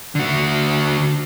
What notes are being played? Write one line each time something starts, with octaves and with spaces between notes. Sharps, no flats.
D3 F#4